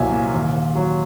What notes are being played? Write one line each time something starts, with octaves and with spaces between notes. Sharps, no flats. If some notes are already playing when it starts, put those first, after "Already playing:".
Already playing: C2 A#2 F#3 E5 G#5
A#2
D#2
D#2
F#3